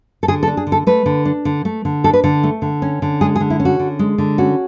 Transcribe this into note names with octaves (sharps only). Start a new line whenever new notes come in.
A4
D3 G#4
A4
D4
G#4
D3
A4
A3 B4
D3
D4
D3
A3
D3
D4 A4
B4
D3 A4
A3
D3
C#4
D3
G#3 G#4
G#4
D3
E4
C#4
F#4
D3
G#3
D3
C#4 F#4